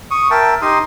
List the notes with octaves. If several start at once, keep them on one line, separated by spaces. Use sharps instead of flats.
C#6 D#6
A#4 E5 G5 A5
D#4 G4 C6 D#6